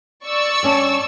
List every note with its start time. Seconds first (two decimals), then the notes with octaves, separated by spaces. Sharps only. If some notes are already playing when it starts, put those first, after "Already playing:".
0.25 D5 C#6 E6
0.63 G2 C#4 A5